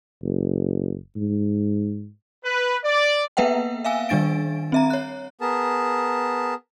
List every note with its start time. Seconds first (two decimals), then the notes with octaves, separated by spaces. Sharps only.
0.22 F#1
1.16 G#2
2.44 B4
2.83 D5
3.37 A#3 B3 B4 E5 F#5 G5
3.85 E5 F5 G#5 E6
4.09 D#3 G3 D4 A6 D7
4.72 C4 E5 A#5
4.90 C#5 F#6
5.41 B3 G#4 A#4 A5